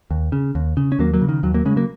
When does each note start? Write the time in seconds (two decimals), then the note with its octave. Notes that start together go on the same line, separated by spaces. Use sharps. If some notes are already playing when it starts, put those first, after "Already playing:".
0.11 D#2
0.32 C#3
0.55 D#2
0.77 C#3
0.92 C#4
0.99 D#2 F#3 A#3
1.14 F#3 A#3
1.21 C#3
1.29 D#3
1.43 D#2 F#3
1.54 F#3 A#3
1.65 C#3 G#3 C#4
1.76 F#3 A#3